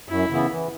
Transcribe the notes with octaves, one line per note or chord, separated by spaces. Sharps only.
F#2 E4
C#3 E3 B3
E3